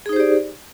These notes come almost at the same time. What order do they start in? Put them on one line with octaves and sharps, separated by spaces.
G#4 D#4 C5 G4 D5